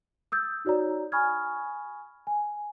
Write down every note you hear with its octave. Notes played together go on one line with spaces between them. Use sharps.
D#6 E6 G6 A6
D#4 F#4 C#5 D5 A#5
G#5 B5 C#6 D#6 F6 G#6
G#5